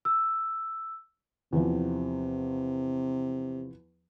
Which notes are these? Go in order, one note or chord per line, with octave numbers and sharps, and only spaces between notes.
E6
E2 C3 F3